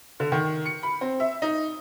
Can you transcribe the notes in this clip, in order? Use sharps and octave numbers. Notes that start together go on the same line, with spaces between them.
D3
D#3
C#7
B5
C4
E5
D#4